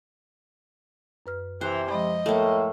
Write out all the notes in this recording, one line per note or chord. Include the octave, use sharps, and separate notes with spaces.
F#2 B4 F6
C3 E3 C5 F#6
F3 G#3 D#5 B5
A2 A3 A#3